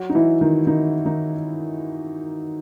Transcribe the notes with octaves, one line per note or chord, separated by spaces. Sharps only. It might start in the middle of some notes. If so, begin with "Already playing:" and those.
Already playing: F#3 F#4
D#4
E3 E4
D#3 D#4
D#3 D#4
D#3 D#4